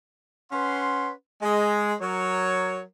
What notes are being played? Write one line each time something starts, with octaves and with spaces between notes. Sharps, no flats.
C#4 B4 F#5 C6
G#3
F#3 A#4 C#5